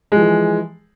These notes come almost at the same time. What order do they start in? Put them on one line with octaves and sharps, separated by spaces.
G#3 F3 E3